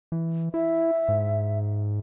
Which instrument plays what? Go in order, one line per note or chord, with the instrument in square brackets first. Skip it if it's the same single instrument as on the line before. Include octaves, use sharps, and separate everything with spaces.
[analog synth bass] E3
[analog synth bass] E4 [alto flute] E5
[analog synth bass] G#2